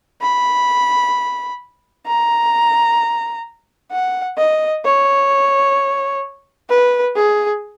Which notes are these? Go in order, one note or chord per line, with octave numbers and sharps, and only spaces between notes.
B5
A#5
F#5
D#5
C#5
B4
G#4